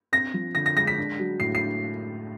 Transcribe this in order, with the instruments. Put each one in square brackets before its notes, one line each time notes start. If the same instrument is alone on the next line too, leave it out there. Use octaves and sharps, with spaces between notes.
[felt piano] C4 [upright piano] A#6
[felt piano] F3
[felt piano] D3 [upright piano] A#6
[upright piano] A#6
[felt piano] G#3 [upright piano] A#6
[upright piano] B6
[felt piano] D4
F#3
[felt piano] A2 [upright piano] C7
[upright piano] C7